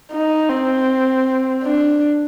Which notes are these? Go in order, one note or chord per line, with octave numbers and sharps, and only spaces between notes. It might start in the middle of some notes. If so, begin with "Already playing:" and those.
D#4
C4
D4